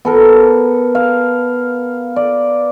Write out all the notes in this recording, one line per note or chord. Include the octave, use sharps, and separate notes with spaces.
B3 A4 A#4
F5
D5